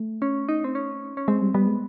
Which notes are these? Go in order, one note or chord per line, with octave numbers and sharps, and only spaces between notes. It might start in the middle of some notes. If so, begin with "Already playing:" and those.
Already playing: A3
C#4
D#4
C4
C#4
C#4
G#3 C4
G3
G3 B3
G#3